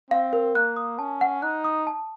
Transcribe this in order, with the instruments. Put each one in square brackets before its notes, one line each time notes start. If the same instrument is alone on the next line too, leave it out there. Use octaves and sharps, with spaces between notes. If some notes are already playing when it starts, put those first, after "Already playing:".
[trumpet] C4 [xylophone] F5
[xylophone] A#4
[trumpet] A#3 [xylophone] F#6
[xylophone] D#6
[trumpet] C#4 [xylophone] A5
[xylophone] F#5
[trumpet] D#4 [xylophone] F#6
[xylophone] D#6
A5